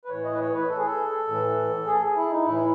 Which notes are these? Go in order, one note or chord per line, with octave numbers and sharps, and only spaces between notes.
B4
A2 E3 C#5
D#5
B4
C#5
B4
A4
G#4
A4
A2 E3
G#4
E4
D#4
A2 E3 E4